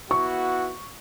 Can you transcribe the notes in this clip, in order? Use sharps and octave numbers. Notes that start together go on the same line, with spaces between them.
B3 E4 F#4 C#6